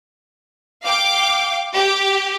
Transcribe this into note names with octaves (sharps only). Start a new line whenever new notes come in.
F5 G5 D6
G4